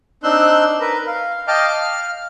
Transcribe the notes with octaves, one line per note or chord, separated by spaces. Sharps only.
C4 D4 D#4 C6 E6 F#6
A#4 B4
F5
D#5 F5 G5 A5 D6 F6
F5 F6